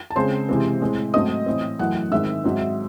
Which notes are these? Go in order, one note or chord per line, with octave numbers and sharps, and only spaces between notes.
A5
C#3 G#3 C4 C5 C6
C3 E3 G#3 C4
A2 G#3 C4
G#2 F#3 A3 C4 D#5 D#6
A2 E3 C4
F#2 E3 A3 F#5 F#6
G#2 D#3 G#3 C4 E5 E6
G#2 F#3 C4